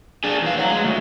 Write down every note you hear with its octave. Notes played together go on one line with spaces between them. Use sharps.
D4 G#4
E2 F5
C#5 F#5
G#3
D2